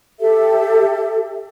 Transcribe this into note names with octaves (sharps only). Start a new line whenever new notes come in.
G4 A4 E5